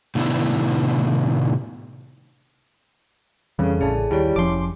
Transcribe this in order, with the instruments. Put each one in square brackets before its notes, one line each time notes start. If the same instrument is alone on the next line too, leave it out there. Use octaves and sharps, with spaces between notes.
[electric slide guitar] A2 C3 D#3 B3 D4 E4
[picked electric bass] F2 E3 G3 [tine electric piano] C#3 [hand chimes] C4 A4
[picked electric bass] A1 A2 [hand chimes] G#4 D5 A5
[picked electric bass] D#2 [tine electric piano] G3 [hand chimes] E4 C#5
[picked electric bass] F1 F3 C#4 [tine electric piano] C6 D6